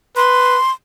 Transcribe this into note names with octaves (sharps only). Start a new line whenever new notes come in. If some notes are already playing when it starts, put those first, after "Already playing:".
B4 C6